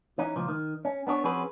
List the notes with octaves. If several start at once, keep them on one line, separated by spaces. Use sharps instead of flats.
E3 C#4 D#4
C#2 A#2 F3
D#3
C#4
B3 D4 G#4 C#5
F3 C4 C#4 F#4 G#4 B4